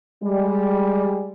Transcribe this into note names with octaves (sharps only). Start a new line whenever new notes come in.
G3 G#3